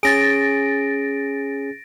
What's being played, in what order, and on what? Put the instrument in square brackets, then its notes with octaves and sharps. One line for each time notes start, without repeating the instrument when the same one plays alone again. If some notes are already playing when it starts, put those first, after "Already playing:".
[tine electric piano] C#4 G#4 [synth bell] A6 A#6 D7